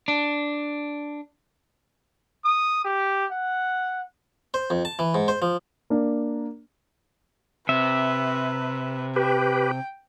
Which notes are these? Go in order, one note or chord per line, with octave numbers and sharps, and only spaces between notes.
D4
D#6
G4
F#5
C5
F2
A5
E3
G#2
C5
F3
A#3 D4
C3 B4 E5
G4 B4 G5